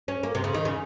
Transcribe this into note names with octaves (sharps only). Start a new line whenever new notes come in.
C#4
A#3
C3
C#3
D#3
C#3